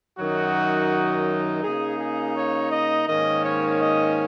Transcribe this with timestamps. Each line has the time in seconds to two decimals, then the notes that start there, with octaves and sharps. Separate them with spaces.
0.18 F#2 D#3 F#3 D#4 F#4
1.63 C#3 A#3 D#4 G#4
2.00 G#4
2.36 C#5
2.72 D#5
3.08 G#2 D#3 A#3 C#4 D#5
3.44 C#5
3.81 D#5